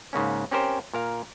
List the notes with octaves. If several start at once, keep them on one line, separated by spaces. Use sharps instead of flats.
G#2 C#3 A#3 C#4
C4 C#4 G4 A#4 C5
A#2 A#4 F5